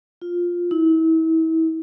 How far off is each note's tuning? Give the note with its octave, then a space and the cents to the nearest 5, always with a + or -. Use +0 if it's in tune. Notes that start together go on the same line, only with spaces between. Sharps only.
F4 +5
E4 -35